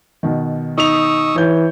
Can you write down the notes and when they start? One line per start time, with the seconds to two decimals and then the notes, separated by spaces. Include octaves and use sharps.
0.23 B2 D#3
0.78 D#4 C#6 D#6 E6 F7
1.36 E3 C#5 G6